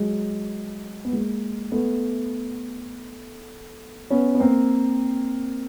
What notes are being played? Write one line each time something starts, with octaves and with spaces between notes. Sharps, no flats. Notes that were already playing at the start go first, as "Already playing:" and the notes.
Already playing: F#3 G#3
B3
G#3 A#3
A3 B3
B3 C#4
B3
A#3 C4